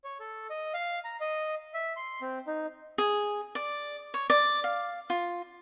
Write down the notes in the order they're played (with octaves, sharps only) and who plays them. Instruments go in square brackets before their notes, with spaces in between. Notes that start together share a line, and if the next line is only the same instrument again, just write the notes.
[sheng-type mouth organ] C#5
A4
D#5
F5
A#5
D#5
E5
C6
C4
D#4
[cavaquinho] G#4
D5
C#5
D5
F5
F4